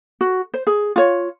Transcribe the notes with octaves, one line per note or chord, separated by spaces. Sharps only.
F#4
C5
G#4
F4 C#5